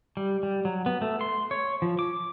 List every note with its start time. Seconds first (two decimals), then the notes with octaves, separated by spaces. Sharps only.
0.17 G3
0.43 G3
0.65 F#3
0.86 B3
1.02 A3
1.21 C6
1.51 C#5
1.82 F3
1.99 D6